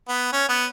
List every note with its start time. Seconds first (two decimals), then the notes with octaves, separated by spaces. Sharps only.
0.08 B3
0.33 C#4
0.49 B3